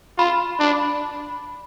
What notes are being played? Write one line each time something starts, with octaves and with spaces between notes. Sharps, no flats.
F4 B5
D4